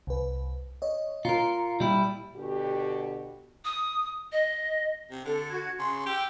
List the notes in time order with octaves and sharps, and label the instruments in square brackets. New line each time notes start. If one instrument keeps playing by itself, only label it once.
[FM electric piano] C2 B4
C#5 D#5
[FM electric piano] A#2 A#5 C#7 [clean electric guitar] F4 A#4
[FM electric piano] A#2 [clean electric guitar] G3 E4
[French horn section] B2 D3 F#4 G4
[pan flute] D#6
D#5
[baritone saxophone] C3
[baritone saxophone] D3 [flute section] A4
[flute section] F#4 G#6
[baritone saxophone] C#3 [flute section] C6
[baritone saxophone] G4 [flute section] G5 E6